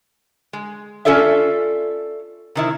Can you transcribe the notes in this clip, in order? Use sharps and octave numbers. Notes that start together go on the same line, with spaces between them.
G#3
C#4 F4 A4 D5 E5
C3 D#3 E4